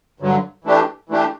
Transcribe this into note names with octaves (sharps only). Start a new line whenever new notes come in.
G2 D3 F#3
E3 A3 D4 G4
E3 A3 D4 G4